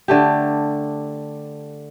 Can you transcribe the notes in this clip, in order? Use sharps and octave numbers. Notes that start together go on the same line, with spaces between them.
D3 A3 G4